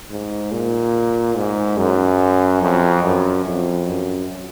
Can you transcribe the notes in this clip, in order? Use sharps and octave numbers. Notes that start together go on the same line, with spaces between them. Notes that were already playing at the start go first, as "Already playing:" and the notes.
G#2
A#2
G#2
F#2
F2
F#2
F2
F#2